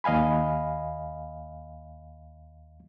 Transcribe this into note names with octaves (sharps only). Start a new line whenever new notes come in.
D#2 D#5 F5 G#5 B5